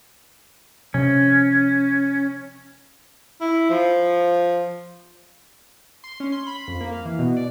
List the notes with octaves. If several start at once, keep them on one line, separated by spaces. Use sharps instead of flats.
C3 F3 C#4
E4
F3
C6
C#4
C6
B5
F2
A#3
F5
E3
B2
D5